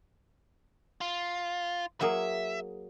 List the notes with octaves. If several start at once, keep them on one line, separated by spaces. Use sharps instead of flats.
F4
F#3 A#3 G#4 E5